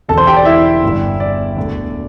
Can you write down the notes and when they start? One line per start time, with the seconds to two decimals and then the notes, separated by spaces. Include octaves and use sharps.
0.08 E1 E2 D3 A4 A5
0.18 C5 C6
0.27 G4 G5
0.37 D5
0.45 E4 E5
0.83 G1 G2 G3
1.20 D5
1.56 E1 D2 D3